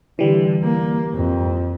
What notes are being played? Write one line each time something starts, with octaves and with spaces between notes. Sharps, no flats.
D3 E3 G3
A#3
F2